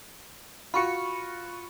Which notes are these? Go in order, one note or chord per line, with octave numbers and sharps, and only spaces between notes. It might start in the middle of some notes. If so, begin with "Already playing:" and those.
F4 F#4 B5 C#6 C#7